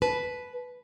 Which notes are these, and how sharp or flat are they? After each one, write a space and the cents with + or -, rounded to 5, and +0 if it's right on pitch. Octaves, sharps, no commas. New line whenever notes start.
B4 +0 A5 -30